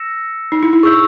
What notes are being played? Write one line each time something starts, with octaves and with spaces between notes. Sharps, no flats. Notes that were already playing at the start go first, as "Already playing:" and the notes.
Already playing: E6 A#6 C#7 E7
D#4
E4
E4
G#4 C#6 E6 G6